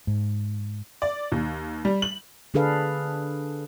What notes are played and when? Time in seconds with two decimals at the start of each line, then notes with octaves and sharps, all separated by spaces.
0.07 G#2
1.02 D5
1.32 D#2
1.85 G3
2.02 F#7
2.54 D3 D4 G#4 A4 B4 F5